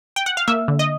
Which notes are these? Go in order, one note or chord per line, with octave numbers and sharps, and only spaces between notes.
G5
F#5
F5
A#3 E5
D3
D#5